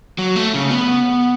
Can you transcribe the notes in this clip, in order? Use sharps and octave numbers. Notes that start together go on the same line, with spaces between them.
F#3
A3
C#3
B3